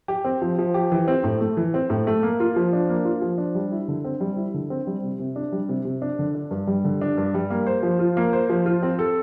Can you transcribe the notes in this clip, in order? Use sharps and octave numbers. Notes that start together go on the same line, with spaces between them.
G4
C4
F3
F3
G4
E3
C4
A2
A3
E3
C4
A2
A3
A#3
F4
F3
D4
A#3
F4
F3
D4
G3
E4
D3
C4
G3
E4
D3
C4
G3
C3
C3
D4
G3
C3
C3
D4
D3
D4
G2
G3
D3
D4
G2
G3
A#3
C5
F3
F4
A#3
C5
F3
F4
C4
A4